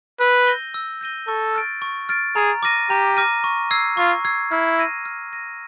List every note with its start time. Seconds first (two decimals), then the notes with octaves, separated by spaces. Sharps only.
0.20 B4 E6
0.47 G6 A#6 D#7 G7
0.74 E6
1.01 G6 A#6 D#7 G7
1.28 A4 C#6
1.55 F6 A6 D7
1.82 C#6
2.09 F6 A6 D7
2.36 G#4 A#5
2.63 D6 F6 A#6 D#7
2.90 G4 A#5
3.17 D6 F6 A#6 D#7
3.44 C#6
3.71 E6 G#6 C7
3.97 F4 C#6
4.25 E6 G#6 C7
4.52 E4 F6
4.79 A#6 D#7
5.06 F6
5.33 A#6 D#7